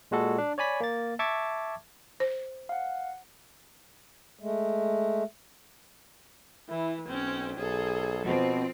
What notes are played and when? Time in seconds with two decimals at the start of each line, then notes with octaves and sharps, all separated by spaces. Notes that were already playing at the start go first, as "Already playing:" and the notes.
0.11 A#2 G#3 F#4 A4
0.38 D4
0.58 C#5 D5 G#5 B5 B6
0.81 A#3 A6
1.19 E5 A5 C#6 D6 G#6
2.20 C5
2.69 F5 F#5
4.39 G#3 A3
6.69 E3 E4
7.08 B1 C4 C#4
7.57 B1 G#4 A4
8.26 B2 F3 C4